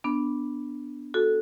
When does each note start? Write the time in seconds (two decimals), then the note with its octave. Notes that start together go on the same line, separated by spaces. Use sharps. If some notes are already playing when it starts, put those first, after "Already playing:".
0.04 B3 D4
1.14 F#4 A4